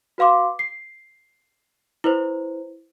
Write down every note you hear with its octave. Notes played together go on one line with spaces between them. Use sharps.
F#4 B4 F5 C6 D6
C7
E4 B4 C5